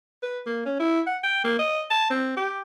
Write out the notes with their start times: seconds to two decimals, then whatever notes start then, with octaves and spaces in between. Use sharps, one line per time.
0.23 B4
0.46 A#3
0.66 C#4
0.80 E4
1.07 F#5
1.23 G5
1.44 A#3
1.59 D#5
1.90 A5
2.10 C4
2.37 G4